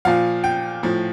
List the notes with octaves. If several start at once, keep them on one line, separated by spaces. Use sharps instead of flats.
A#2 F3 F5
G5
A2 F3